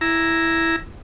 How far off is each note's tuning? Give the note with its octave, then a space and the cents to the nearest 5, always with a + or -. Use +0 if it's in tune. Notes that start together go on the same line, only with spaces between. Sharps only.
E4 +0 A#5 +5